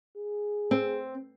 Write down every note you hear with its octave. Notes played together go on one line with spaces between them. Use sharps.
G#4
C4